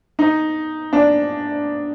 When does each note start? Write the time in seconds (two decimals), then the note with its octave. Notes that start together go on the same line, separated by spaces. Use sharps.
0.19 D#4
0.93 D4